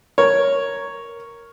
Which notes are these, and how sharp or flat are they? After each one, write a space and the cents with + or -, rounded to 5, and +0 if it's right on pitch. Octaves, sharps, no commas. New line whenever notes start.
A#4 +0 C#5 +0